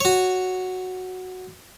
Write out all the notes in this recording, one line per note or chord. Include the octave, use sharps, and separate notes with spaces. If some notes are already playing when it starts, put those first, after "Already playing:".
F#4 C#5